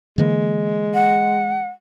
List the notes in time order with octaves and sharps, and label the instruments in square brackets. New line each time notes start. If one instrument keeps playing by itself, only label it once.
[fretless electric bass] D3 E3 A#3 [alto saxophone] G#3
[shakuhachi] F#5